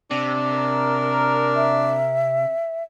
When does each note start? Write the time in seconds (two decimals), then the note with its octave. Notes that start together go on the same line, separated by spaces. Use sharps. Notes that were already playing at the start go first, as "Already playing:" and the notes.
0.11 C3 D4
0.50 A#4
1.56 E5